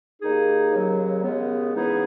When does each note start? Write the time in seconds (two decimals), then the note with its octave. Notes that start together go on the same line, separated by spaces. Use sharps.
0.21 D#2 D#3 A#3 D#4 G#4
0.73 D#2 C#3 F#3
1.24 D#2 C#3 G#3 B3
1.75 C#3 E3 B3 D#4 G#4